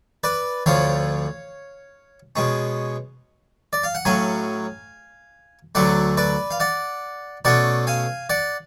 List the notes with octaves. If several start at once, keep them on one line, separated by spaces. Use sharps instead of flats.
B4 D5
D2 D3 F3 C#5 F5
B2 G#3 C#4
D5
F5
F#5
A2 F#3 C#4 F5 G#5
D2 D3 F#3 A3 D5 F#5
B4 D5
F5
D5 F#5
B2 A3 C#4 D5 F#5
F5 G#5
D5 F#5